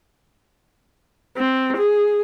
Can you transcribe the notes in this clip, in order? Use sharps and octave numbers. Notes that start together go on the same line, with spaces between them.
C4
G#4